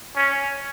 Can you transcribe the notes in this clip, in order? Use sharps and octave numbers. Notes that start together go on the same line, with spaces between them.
C#4